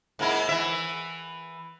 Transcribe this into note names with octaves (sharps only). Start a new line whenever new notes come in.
G#2 A#3 E4
E3 E5